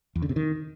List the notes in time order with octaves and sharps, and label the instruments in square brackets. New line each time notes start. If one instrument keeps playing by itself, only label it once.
[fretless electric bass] E2
D3
C3
D#3